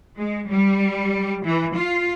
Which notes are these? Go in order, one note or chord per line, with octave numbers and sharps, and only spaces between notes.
G#3
G3
E3
F4